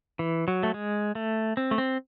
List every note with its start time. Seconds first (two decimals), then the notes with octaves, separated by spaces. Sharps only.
0.19 E3
0.48 F#3
0.63 A3
0.74 G#3
1.15 A3
1.57 C4
1.71 A3
1.78 C4